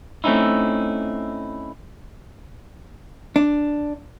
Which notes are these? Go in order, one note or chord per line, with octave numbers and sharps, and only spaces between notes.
A3 C4 C#4 D#4 E4
D4